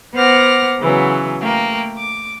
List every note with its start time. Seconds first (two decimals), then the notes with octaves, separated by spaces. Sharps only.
0.14 B3 C5 F#5 D6 F6 A#6
0.79 C#3 E3 F#3 B3
1.41 A3 A#3 G5
1.98 D6